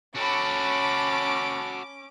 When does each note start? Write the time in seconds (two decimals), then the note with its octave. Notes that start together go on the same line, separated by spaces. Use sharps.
0.16 C#4 F#4 A4 A5 B5 D6